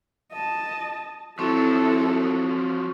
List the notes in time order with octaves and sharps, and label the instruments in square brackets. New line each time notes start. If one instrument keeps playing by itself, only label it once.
[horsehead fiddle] D#5 A5
[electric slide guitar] F3 F#3 [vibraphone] C4 C#6 [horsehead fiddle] E4 A4 [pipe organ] F#4